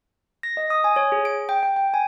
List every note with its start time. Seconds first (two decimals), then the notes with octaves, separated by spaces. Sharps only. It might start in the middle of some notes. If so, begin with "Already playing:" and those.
0.43 A#6
0.57 D#5
0.70 D#6
0.84 G#5
0.96 C#5
1.12 G#4
1.25 D7
1.49 G5
1.63 G5
1.76 G5
1.94 G#5